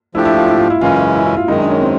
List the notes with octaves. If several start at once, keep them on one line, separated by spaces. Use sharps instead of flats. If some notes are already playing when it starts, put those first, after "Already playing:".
F3 A3 D4 E4 G4
E4
F4
E4
F4
E4
F#2 C#3 E3 G#3 C#4 F4
E4
E4
F4
F#2 D#3 G#3 D#4
D4
C#4
C4